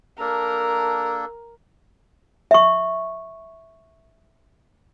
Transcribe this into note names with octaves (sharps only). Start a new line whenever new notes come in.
A#3 D4 A4 A#4
E5 C#6